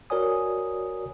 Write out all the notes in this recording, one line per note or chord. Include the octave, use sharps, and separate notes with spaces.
F#4 A#4 C#5 D5 G#5 D#6